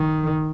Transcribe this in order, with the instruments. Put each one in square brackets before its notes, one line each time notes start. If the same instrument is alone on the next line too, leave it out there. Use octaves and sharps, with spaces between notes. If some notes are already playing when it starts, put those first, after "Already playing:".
Already playing: [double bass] D#3